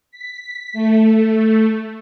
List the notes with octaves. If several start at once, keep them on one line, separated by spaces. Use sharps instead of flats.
B6
A3